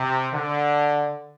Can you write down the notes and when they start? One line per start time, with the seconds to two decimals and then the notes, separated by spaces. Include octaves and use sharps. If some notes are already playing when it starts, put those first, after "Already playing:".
Already playing: C3
0.33 D3